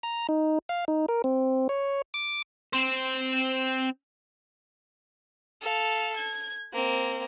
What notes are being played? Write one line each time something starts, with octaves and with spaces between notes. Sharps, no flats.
A#5
D#4
F5
D#4
A#4
C4
C#5
D6
C4 C5
A4 F5
G#6
A#3 C4